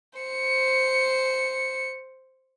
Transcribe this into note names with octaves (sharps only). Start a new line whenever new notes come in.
C5 C#7